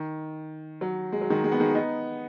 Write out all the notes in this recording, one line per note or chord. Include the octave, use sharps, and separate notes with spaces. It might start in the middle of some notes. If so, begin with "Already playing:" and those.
Already playing: D#3
F#3
G#3
F#3
D#3 G#3
G#3
B3
D#3 G#3
B3 D#4